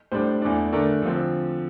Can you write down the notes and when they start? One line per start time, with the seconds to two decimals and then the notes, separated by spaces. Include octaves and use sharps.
0.12 A2 G3 D4 C5
0.42 E2 E3 A3 D4
0.73 D3 A3 D4 A#4
1.02 D3 F3 C4